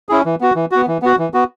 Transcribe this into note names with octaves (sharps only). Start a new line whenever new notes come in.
C#4 E4 G#4
E3
B3 F#4
E3
B3 F#4
E3
B3 F#4
E3
B3 F#4